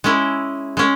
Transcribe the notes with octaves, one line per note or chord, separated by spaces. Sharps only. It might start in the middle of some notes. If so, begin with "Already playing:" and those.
G#3 C#4 E4
G#3 C#4